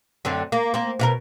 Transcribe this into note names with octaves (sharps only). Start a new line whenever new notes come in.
F#2 D3 C4
A#3
A#3 C4
B2 F4 A#4